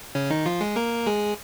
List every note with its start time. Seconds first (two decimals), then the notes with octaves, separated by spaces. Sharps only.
0.15 C#3 C#4
0.30 D#3 D#4
0.46 F3 F4
0.61 G#3 G#4
0.76 A#3 A#4
1.06 G#3 G#4